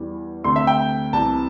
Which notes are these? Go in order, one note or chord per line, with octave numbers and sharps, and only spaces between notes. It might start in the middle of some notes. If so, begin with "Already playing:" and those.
Already playing: E2 E3 G3
D2 C3 A3 C6
E5
G5
C2 C3 E3 A5